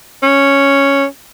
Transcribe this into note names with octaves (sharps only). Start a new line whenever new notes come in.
C#4